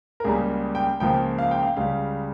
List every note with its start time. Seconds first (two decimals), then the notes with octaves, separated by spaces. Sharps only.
0.20 A#4
0.24 C#2 C#3 G3 A#3 G#4
0.75 G5
1.00 C#2 C#3 F3 A#3 G5
1.39 F5
1.51 G5
1.63 F5
1.77 C#2 C#3 G3 F5